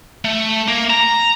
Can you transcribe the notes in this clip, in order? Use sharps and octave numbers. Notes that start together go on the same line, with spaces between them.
A3
A#3
A#5